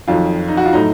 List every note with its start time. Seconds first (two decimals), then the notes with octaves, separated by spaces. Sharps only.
0.08 F2 D#3 F#3 F4
0.48 D#4
0.57 F#4
0.66 F4
0.73 A2 F#3 D#4